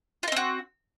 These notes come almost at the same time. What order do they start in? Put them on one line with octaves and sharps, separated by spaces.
F4 D#4 C4 F#4